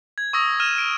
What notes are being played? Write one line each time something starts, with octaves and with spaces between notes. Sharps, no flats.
G#6
C#6 D#6 E6 A#6
F6 D#7 E7
D7